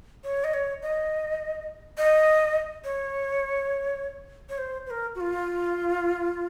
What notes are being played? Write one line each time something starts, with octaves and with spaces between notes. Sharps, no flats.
C#5
D#5
C#5
D#5
D#5
C#5
C#5
C5
C5
A#4
F#4
F4